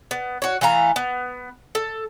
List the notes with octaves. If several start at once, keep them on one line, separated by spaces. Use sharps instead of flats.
B3
F#4 C#5
E3 A3 F5 A#5
B3
A4